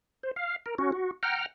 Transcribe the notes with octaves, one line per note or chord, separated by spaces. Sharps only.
C5
F5
A#4
C#4 F#4
F#4
F#5 G5 A#5 F6